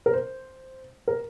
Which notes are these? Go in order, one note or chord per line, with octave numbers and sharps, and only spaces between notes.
A#4
C5
A#4